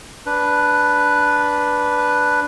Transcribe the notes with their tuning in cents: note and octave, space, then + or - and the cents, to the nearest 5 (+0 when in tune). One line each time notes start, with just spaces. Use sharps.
D4 -5 B4 +0